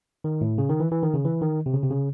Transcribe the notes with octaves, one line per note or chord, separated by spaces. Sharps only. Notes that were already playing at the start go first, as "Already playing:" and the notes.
D#3
A2
C#3
D#3
E3
E3
D#3
C#3
E3
D#3
C3
C#3
C3
C#3